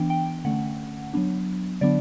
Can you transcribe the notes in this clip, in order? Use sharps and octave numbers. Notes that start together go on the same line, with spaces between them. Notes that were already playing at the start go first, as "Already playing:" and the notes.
Already playing: E3 B3 D4 G5
G5
D3 A3 C#4 F#5
F#3 B3 D4
D3 F#3 B3 D4 D5